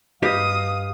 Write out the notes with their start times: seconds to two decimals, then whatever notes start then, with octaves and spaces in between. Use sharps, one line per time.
0.23 G2 G4 B4 D#5 F5 D#6